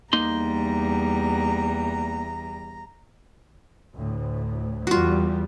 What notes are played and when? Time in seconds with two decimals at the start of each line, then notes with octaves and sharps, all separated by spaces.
0.13 E2 G3 A#3 D#4 A#5 C6
3.94 D2 A2
4.87 E2 G3 F4 F#4